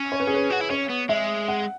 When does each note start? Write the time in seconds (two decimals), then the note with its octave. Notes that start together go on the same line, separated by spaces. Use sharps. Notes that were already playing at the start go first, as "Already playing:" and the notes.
Already playing: C#4
0.12 C#5
0.20 B4
0.27 G#4
0.34 B4
0.50 F#4
0.60 E4
0.70 C#4 C#5
0.89 B3
1.09 G#3 E5
1.48 F#5